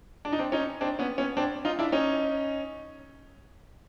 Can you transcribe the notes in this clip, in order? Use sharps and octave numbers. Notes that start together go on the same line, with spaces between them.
D4
D#4
C4 D4
C#4 D#4
C4 D4
B3 C#4
B3 C#4
C4 D4
D#4 F4
D4 E4
C#4 D#4